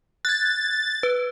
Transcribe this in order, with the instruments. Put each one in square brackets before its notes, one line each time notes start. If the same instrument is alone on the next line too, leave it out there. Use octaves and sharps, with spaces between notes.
[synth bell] F#6 G#6 [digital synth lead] A6
[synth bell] B4